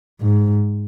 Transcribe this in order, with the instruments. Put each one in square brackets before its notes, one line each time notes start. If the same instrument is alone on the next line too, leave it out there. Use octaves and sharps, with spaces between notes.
[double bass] G#2